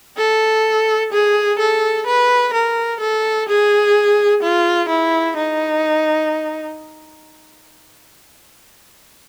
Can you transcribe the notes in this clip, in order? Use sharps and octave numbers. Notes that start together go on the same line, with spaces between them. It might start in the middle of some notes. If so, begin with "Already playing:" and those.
A4
G#4
A4
B4
A#4
A4
G#4
F4
E4
D#4